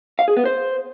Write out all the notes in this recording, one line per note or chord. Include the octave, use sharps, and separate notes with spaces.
F5
G#4
B3
C5